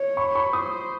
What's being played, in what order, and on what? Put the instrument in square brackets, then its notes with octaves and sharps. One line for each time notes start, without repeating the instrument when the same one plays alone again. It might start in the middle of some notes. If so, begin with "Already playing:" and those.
Already playing: [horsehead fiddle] C#5
[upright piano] B5 C#6
B5 C#6
[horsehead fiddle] C5 [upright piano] C#6 D#6